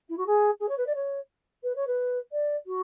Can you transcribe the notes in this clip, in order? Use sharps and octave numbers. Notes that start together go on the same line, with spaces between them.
E4
F#4
G#4
G#4
C#5
B4
D5
C#5
B4
C#5
B4
D5
F#4